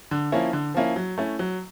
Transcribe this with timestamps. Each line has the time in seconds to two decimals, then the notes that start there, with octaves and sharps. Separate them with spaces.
0.11 D3
0.32 F3 A#3 C#4 E4
0.53 D3
0.74 F3 A#3 C#4 E4
0.96 F#3
1.18 A3 C#4 E4
1.39 F#3